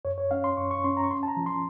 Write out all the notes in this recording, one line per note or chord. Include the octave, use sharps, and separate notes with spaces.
F#2 C#5
C#5
C#4 F5
C6
F#2 C#6
C#6
C#4 C6
A#5
C#6
C#4 C6
A5
A#5
F3
C6